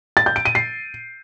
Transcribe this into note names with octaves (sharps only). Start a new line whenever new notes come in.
A6
G6
D7
D#7
C7